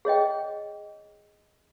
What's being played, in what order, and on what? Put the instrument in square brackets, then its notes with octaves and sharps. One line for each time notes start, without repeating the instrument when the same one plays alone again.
[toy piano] G#4 C#5 D#5 G5